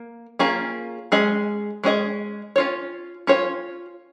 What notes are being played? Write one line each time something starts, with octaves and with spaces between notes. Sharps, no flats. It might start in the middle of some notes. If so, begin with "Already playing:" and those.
Already playing: A#3
A#3 C#4 F4 G#4
G#3 C#4 G#4 D#5
G#3 C#4 G#4 D#5
C#4 F4 C#5
C#4 F4 C#5